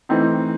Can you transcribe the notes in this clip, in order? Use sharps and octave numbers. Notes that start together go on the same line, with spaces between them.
E3 A3 C4 D#4